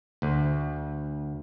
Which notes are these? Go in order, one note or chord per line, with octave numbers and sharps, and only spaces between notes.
D2